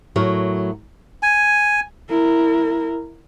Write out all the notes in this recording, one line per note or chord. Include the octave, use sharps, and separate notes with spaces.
A2 F#3 A#4
G#5
E4 A#4